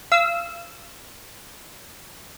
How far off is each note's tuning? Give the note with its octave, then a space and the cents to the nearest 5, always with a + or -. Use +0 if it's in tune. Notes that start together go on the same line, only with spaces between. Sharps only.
F5 -35 E6 -20